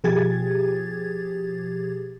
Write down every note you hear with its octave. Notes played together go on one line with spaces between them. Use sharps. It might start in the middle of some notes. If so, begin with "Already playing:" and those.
B2 F3 G4 G#4 G#6 A6